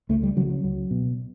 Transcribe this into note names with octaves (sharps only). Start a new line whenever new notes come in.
C#2 A3
G3
C#3 F#3
F#3
C#2 F#3
B2